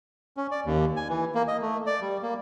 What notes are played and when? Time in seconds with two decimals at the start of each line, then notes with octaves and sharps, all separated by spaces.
0.37 C#4
0.51 D5
0.65 D#2
0.97 G#5
1.10 E3
1.35 A#3
1.48 D#5
1.61 A3
1.87 D5
2.01 G3
2.23 A#3